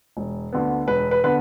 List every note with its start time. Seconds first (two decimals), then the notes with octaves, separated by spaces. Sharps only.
0.17 E1
0.53 D2 D3 B3
0.87 E1 B4
1.11 B4
1.24 D3 B3 B4